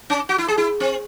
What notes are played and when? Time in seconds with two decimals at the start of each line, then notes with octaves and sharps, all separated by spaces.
0.10 C#4
0.29 F#4
0.38 E4
0.48 G#4
0.58 E4
0.80 C4